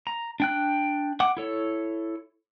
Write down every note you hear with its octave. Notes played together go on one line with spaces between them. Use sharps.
A#5
D4 G5 F#6
F#5 D6
E4 A4 C#5